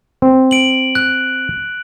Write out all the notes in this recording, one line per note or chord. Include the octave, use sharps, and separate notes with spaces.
C4
D7 F#7
F#6